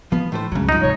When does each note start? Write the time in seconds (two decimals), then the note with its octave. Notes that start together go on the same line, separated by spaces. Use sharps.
0.12 E3 F3 B3
0.32 A2 A3 C5
0.52 C#2 G2 C#3 F#3
0.69 G#2 F3 D#4
0.82 C3 G#3 C#5